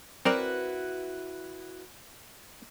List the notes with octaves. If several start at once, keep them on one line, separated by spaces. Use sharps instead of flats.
C4 E4 F#4 A#4 B4 D5